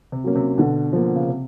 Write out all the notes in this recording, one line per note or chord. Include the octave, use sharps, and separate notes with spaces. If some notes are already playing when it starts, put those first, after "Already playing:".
C3
F#3 A#3 C#4
C3
B2 D3
F3 A#3
D3
C#3
C3